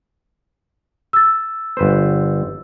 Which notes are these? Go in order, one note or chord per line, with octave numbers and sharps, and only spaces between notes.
E6 A6
G1 B4 C5